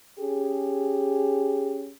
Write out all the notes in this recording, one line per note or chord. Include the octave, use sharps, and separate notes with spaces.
C#4 G4 G#4